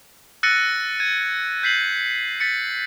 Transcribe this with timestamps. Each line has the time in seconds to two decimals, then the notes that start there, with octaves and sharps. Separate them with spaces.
0.43 E6 F#6 A6 A#6 C#7 D#7
1.00 G#6 D#7
1.63 G6 B6 C7 F#7
2.40 A6 B6 C#7